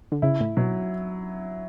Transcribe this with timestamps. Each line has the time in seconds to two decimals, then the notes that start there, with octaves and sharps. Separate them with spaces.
0.12 D3
0.22 C#3 E4
0.40 A2
0.57 B2 F#3